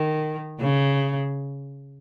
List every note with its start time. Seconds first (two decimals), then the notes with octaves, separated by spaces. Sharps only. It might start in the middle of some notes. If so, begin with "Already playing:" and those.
Already playing: D#3
0.60 C#3